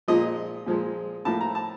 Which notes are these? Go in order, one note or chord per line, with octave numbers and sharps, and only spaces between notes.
A#2 F3 G#3 D#5
A#2 F3 G#3
A2 F3 A#3 A5
A#5
A5